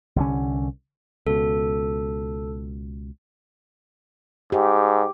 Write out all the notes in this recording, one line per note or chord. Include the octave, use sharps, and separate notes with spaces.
C2 D3 C#4
C#2 B2 A4
G#2 G4